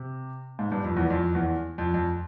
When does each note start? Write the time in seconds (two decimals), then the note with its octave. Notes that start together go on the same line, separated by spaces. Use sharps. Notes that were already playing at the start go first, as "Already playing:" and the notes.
Already playing: C3
0.59 G#2
0.72 G2
0.84 F2
0.97 E2
1.10 F2
1.35 E2
1.78 F2
1.94 F2